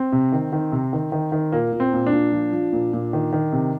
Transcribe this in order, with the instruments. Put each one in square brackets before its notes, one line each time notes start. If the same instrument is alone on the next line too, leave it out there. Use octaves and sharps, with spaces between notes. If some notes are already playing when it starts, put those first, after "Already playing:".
Already playing: [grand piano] C4
C3
D#3
D#3
C3
D#3
D#3
D#3
A#2 A#3
A#2
C4
A#2
D4
A#2
F3
F3
A#2
A#2
D#3
D#3
C3